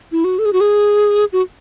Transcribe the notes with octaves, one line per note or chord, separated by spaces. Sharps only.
E4
F#4
A4
G#4
F#4
G#4
F#4